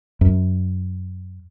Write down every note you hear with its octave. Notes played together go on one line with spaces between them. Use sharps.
F#2